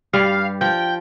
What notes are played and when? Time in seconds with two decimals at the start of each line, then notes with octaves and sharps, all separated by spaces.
0.13 G2 G3 F5
0.61 F3 G5